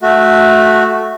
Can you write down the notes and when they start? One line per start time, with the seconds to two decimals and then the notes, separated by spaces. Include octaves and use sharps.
0.02 A3 F#4